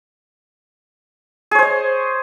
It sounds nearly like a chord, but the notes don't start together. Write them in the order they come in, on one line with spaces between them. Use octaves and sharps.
G#4 C#5 C5 D#5